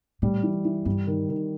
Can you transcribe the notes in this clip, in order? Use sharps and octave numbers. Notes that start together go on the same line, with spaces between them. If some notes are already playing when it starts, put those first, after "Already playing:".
A2 G3
E3
E3
G2 G3
D#3
D#3